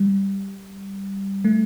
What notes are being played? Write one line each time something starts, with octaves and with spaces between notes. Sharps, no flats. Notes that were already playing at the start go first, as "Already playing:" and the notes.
Already playing: G3
A3